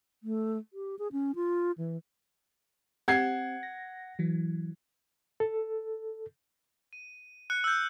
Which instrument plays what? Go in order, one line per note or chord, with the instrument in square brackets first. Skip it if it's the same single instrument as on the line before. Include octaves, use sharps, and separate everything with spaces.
[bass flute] A3
G4
G#4
C#4
F4
E3
[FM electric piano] C4 G4 [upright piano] F#5 G#6 C7
[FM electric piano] A#6
E3 F#3
[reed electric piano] A4
[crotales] D#7
F#6 C#7
E6 G6